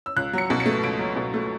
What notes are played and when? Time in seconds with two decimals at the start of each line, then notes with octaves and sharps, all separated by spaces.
0.06 E6
0.16 C#2 F#6
0.33 F#3 C#7
0.50 B2
0.60 C#7
0.66 A3
0.83 C#2 D7
0.99 F#3
1.16 B2
1.34 A3